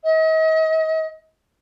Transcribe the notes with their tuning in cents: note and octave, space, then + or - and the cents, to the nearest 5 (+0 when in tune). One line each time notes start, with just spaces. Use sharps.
D#5 +40